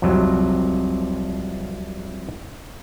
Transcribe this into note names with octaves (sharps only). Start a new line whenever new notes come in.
C2 F2 C3 F#3